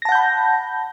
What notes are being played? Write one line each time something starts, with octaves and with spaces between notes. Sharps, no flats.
F#5 A5 B5 G6 A#6